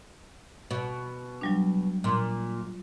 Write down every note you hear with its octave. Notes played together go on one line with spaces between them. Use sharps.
B2
F#3 G3 D4
A#2 C6 D6